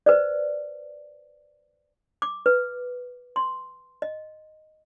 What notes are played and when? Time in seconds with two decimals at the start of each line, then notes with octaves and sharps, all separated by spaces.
0.06 B4 C5 D5
2.22 D6
2.46 B4
3.36 C6
4.02 D#5